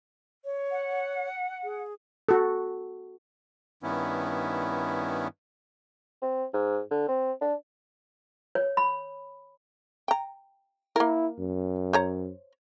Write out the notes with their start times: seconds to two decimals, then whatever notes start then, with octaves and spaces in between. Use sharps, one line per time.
0.45 C#5
0.70 F#5
1.64 G#4
2.29 F#4 A4
3.83 G2 D#3 B3 C#4 E4
6.22 C4
6.53 G#2
6.91 D3
7.08 C4
7.41 D4
8.55 C#5
8.77 B5
10.08 G5 A#5
10.96 A#3 E4 A#4
11.39 F#2
11.93 C5 C#5 A#5